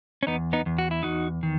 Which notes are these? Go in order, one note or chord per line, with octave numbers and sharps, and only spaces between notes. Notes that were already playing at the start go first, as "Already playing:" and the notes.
C#4
E2 B3 D#4
B3 D#4
E2
F#4
E4
E2 D#4 F#4
D#3